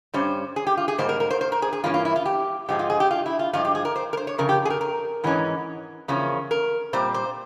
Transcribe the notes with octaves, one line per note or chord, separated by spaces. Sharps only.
G2 G3 C#4 C5
G#4
G4
F4
G#4
G#2 G3 A#3 C5
A#4
A#4
C5
C5
A#4
G#4
G#4
G2 E3 A#3 C#4 F4
F4
E4
F4
G4
G#2 F3 G#3 G4
F4
G#4
G4
F4
E4
F4
G2 F3 G#3 F4
G4
G#4
A#4
C5
A#4
C5
C#5
F2 C#3 A#4
G4
G#4
A#4
A#4
G#2 E3 G#3 C#4
E2 C#3 F3 A#3 C#4
A#4
A#2 G3 C4 C5
C5